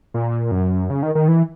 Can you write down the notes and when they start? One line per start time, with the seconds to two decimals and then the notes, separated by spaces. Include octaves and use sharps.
0.14 A#2
0.51 F#2
0.90 C#3
1.03 D#3
1.15 D#3
1.28 E3